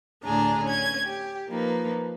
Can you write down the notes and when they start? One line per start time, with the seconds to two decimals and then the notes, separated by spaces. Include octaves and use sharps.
0.24 D2 A2 D3 D4 G#4 A#5
0.64 C#4 G#6
1.06 G4
1.48 F3 A#3 D#4 B4